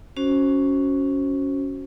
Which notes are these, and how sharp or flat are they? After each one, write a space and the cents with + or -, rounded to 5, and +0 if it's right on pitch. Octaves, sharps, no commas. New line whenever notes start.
C#4 +5 F#4 +0 C5 +15